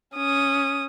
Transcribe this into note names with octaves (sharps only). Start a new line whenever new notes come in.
C#4 D#6